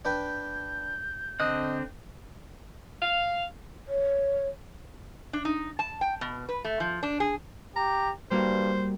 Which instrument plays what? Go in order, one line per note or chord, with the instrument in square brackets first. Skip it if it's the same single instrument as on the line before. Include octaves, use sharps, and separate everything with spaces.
[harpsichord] D4 B4 G5 [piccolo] G6
[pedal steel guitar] D3 C4 F#6 [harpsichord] D#5
[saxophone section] F5
[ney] C#5
[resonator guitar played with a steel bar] D4
D#4
A5
G5
B2
B4
A3
F3
D4
G#4
[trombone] G4 [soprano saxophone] A#5
[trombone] G2 [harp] G3 A#3 F#4 [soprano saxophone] C5